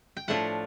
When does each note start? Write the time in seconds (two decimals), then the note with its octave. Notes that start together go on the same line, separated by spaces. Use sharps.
0.17 G5
0.28 A2 F3 A3 D4 F4 F#5